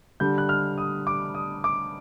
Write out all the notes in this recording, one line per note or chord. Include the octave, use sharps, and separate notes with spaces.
D3 G3 G6
F#6
F6
D#6
D6
D#6
D6